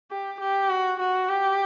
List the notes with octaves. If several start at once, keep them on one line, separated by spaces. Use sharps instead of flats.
G4
G4
F#4
F#4
G4